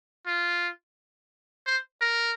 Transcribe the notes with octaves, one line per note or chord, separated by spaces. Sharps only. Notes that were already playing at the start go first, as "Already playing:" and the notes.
F4
C5
A#4